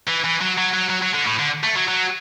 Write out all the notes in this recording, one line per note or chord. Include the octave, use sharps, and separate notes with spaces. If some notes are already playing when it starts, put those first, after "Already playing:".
E3
E3
F#3
F#3
F#3
F#3
F#3
D3
A2
D3
A3
F#3
F#3